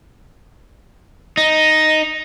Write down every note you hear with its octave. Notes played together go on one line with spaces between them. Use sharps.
D#4